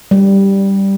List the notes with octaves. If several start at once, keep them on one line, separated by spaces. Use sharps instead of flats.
G3